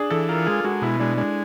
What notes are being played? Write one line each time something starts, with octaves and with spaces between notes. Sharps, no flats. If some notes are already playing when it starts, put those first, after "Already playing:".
Already playing: D4 G#4
E3 A4
F4 A#4
G#3 G#4
G#3 F#4
B2 E4
G#3 D4
G#3 D4